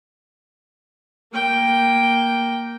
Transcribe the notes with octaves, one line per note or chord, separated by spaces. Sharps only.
A#3 G5